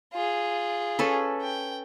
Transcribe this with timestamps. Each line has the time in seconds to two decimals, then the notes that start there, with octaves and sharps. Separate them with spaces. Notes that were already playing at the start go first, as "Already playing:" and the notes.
0.13 F4 G#4
0.99 C#4 A4 B4
1.42 G5